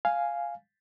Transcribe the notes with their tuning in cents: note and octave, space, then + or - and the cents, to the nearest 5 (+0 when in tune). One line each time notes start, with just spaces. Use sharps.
F5 +0 G#5 +0